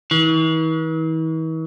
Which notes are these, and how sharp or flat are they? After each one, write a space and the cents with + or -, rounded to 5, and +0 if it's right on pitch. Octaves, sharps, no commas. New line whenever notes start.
E3 -45